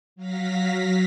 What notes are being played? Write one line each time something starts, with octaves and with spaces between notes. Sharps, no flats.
F#3 F5 A#6 B6